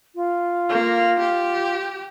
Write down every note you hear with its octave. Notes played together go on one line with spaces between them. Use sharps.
F4
A#3
G4